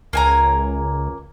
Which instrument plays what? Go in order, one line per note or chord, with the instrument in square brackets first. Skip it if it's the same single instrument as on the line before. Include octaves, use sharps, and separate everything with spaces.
[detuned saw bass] C#2 [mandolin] A#3 G#5 A#5